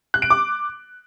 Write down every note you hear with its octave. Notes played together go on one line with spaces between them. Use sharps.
F#6
D7
D6